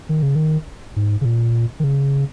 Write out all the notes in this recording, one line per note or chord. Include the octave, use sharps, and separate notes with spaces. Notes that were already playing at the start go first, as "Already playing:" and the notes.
D#3
C#3
D#3
G#2
C#3
A#2
D#3
C#3